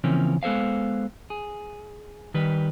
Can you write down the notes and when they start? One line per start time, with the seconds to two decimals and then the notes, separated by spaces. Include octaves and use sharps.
0.04 C#3 E3 F3 A#3 C4 C#4
0.43 G#3 B3 A4 C5 F5
1.30 G#4
2.34 D#3 G3 B4